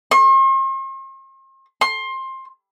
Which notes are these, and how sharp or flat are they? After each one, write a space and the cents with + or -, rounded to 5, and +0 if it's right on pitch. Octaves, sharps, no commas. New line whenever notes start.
C6 +45
C6 +20